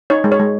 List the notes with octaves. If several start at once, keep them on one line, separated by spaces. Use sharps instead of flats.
D#4 C#5
G#3
C#5
G#3